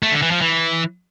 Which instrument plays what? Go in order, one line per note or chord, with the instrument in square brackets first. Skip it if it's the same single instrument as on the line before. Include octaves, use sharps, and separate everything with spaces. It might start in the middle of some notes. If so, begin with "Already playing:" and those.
[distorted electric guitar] A3
D3
E3
F3
E3